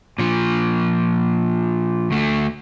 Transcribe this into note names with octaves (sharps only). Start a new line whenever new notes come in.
A#2 F3
D2 A3